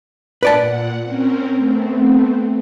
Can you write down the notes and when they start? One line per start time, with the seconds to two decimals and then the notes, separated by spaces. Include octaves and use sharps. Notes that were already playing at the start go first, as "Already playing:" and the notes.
0.43 A#2 B4 D5 F#5 A5
1.02 C4 C#4 A#4
1.55 A3 B3 C4